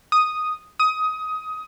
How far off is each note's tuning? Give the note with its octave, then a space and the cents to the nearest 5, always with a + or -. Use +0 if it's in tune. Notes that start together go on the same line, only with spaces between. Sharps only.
D#6 -5
D#6 +20